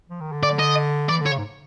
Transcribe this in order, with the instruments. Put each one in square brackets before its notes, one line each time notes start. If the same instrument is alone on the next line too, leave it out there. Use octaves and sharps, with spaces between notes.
[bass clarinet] F3
D#3
D3
[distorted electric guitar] D5
D#5
[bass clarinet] E3 [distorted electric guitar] D5
[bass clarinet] D3
[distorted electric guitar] C#5
[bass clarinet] C#3
G#2